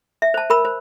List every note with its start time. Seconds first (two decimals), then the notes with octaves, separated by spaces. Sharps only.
0.22 E5
0.34 C5 A5
0.50 A#4 B5 E6
0.65 C5